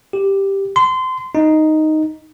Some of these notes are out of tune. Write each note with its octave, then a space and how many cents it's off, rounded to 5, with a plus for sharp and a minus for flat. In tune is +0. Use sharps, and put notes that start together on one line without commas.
G4 +0
C6 -25
D#4 +0